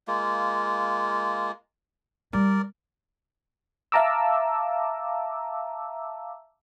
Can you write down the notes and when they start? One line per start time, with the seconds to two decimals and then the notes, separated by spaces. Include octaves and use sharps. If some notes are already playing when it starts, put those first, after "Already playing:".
0.08 G#3 A#3 F4
2.33 G3 A#4 D5
3.92 E5 F5 A5 A#5 D6 E6